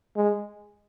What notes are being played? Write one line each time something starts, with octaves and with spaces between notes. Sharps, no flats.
G#3